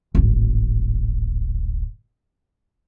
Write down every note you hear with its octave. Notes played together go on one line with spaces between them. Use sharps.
D1 G#1